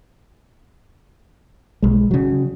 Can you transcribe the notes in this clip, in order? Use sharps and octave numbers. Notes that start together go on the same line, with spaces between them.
B1 G#3
C#3 F#3